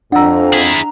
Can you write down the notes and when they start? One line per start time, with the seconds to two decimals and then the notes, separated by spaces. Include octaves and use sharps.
0.12 F2 D4 F#5 A#5 E6
0.53 E4 G#4